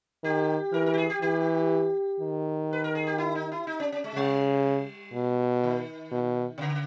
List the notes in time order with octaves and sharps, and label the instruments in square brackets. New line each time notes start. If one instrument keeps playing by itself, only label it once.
[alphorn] D#3 [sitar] G4
[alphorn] E3 [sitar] A#4
[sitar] A#4
G4
G#4
G4
[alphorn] E3 [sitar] G4
[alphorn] D#3
[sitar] B4
A#4
G#4
G4
E4
D#4
E4
D#4
C#4
C#4
G#3
[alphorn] C#3 [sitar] G3
[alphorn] B2
[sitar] D#3
[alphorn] B2
[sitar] B2
C#3